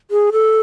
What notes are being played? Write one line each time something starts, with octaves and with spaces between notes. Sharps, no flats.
G#4
A4